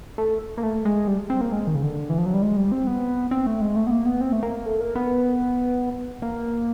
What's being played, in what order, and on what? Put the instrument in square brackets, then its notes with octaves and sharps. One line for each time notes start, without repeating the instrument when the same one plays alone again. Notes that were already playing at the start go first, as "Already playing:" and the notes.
[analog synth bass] A3
A#3
A3
G#3
G3
C4
A#3
G#3
D#3
C#3
D3
E3
F3
F#3
G3
G#3
G3
C4
B3
C4
A3
G#3
A3
B3
A#3
B3
C4
A3
A#3
A3
A#3
B3
A#3